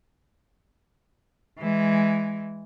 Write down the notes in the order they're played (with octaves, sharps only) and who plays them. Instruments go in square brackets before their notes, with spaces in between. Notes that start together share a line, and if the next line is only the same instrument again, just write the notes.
[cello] E3 G#3